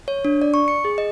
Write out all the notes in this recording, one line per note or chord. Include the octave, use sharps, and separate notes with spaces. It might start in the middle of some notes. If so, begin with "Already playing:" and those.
C#5
D4
D5
C#6
C#7
G#4
D#5